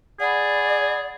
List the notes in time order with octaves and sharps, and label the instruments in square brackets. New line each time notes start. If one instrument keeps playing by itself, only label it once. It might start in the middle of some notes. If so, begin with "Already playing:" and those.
[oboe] G#4 [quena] D5 [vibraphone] F#5 B5